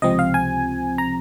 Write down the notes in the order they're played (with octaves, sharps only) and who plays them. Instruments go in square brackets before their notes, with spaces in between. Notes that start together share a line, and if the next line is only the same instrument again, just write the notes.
[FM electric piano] C#2 C3 F3 C4 D#5
F5
G#5
A#5